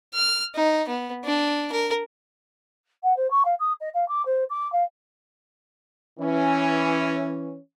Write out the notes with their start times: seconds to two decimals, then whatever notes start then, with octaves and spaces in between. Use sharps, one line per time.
0.14 F6
0.55 D#4
0.88 B3
1.24 D4
1.72 A#4
3.03 F#5
3.17 C5
3.30 C#6
3.45 F5
3.59 D#6
3.80 D#5
3.94 F5
4.08 D6
4.26 C5
4.50 D6
4.72 F5
6.20 E3 C#4